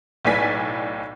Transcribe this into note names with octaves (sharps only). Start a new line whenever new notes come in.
B1 A2 B4 D5 G#5 B6